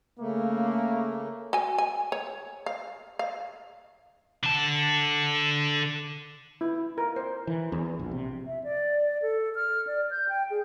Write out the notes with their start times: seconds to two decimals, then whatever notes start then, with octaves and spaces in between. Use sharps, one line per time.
0.19 C#3 A3 A#3
1.53 F#4 G#5
1.78 G#5
2.12 C#5
2.66 F5
3.19 F5
4.43 D3 A5
6.61 E4
6.98 A#4
7.16 C5
7.47 E3
7.72 E2
7.99 A#1
8.11 C3
8.46 E5
8.64 D5
9.22 A4
9.55 F6
9.87 D5
10.11 G6
10.29 G5
10.51 G#4